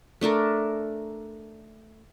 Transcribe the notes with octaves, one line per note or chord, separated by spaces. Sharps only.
A3 D4 A4 A#4